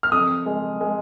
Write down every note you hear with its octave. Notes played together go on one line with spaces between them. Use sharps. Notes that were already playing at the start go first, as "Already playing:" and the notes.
F6
F2 D#6
G#3
G#3